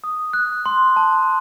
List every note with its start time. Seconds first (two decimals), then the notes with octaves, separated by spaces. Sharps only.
0.04 D#6
0.33 F#6
0.66 C6
0.96 A5